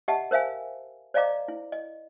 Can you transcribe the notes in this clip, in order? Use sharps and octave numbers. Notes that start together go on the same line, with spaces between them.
G4 D#5 E5 F#5 A5
A#4 C5 E5 F5 G#5
C5 D5 D#5 F5 A#5 D6
E4
D#5